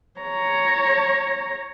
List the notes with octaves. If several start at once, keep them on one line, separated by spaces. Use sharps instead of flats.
C#5 A#5